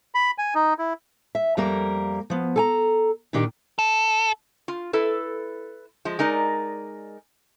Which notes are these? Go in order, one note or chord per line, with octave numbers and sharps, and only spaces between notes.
B5
G#5
D#4
E4
E5
F2 G3 A#3 A#4
F3 B3
A4 G#5 A#5
A#2 D#3 D4 D#4 G4
A4
F4
E4 A4 B4
F3 G#3
G#3 D#4 A#4 D5